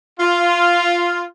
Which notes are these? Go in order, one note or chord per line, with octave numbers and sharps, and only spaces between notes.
F4